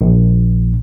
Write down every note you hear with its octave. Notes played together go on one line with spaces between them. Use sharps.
A#1